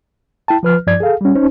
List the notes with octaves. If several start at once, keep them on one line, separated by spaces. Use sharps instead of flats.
E4 G5 A5
F3 B4 F6
G2 F3 D5 G#6
G#4 A4 F5
G3 C#4
C#4 D#4 C5